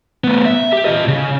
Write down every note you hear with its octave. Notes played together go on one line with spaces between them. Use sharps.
A3 B3
E5
G4
F4 D#5
C#3